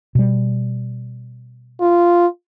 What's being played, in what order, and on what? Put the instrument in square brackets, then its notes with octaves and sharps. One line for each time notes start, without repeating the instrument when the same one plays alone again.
[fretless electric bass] B2 G3
[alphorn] F4